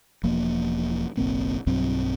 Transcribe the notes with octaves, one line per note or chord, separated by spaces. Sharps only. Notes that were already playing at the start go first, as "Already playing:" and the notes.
E1 F3 A#3
F#1 B1 A#3 C4
B1 G2 F#3 C4